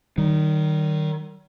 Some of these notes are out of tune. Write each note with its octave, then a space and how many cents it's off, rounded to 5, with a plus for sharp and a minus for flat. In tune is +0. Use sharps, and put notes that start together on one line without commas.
D#3 -15 G3 -45